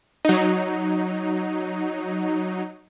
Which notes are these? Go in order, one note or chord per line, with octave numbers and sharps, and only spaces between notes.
F#3 D#4